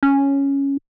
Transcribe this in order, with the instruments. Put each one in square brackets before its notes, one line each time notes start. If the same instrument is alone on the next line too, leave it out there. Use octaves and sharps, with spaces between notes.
[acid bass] C#4